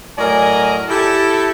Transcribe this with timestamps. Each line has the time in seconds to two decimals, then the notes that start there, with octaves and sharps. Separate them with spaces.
0.18 A2 F#3 A#4 D5 D#5 G#5
0.89 E4 G4 A4